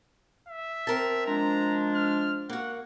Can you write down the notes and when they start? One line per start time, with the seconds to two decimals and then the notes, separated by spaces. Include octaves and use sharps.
0.49 E5
0.87 C4 A#4 A5
1.27 F3 G#3 D4 A#5
1.95 F6
2.49 A#3 F#4 F#5